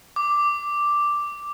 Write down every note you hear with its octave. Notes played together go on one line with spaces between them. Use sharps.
D6